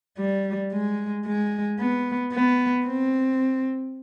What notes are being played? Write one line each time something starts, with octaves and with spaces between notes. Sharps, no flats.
G3
G#3
G#3
B3
B3
C4